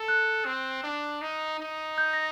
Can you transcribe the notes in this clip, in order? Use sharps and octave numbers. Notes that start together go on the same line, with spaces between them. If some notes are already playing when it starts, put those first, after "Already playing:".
Already playing: A4
F#6
C4
D4
D#4
D#4
G6
A#6